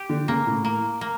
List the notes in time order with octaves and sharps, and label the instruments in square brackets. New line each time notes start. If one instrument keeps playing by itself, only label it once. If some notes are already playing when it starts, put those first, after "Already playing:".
Already playing: [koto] G4
[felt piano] D3
[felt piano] C#3 [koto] A#3
[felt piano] A2
[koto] A#3
A#3